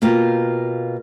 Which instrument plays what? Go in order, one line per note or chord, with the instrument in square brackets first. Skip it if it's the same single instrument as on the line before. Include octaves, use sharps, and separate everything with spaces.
[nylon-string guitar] B2 A#3 F4 G4 A#4 F5